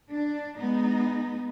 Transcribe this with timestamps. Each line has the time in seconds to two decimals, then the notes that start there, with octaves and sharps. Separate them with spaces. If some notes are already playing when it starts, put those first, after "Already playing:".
0.12 D4
0.58 G#3 B3 D#4